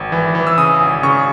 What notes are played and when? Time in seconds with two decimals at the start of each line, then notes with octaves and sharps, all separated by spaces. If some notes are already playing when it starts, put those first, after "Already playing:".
Already playing: G#1
0.12 E3
0.35 E3
0.47 E6
0.57 C#3 D#6
0.80 G#1
1.03 C#3 C#6